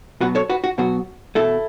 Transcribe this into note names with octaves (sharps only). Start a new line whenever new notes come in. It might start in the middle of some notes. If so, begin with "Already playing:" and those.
B2 F#3 B3 F#4 B4
A4 C#5
F#4 B4
F#4
B2 F#3 B3 F#4
E2 B2 A3 E4 A4